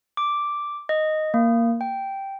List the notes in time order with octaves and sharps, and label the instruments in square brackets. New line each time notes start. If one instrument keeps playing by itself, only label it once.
[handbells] D6
D#5
A#3
G5